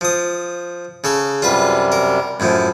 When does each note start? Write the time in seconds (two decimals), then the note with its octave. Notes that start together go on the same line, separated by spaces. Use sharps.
0.01 F3 D#6
1.04 C#3 A4 C#6
1.42 F#2 C3 G3 F4 B4
1.92 A#4
2.40 F#2 A2 F3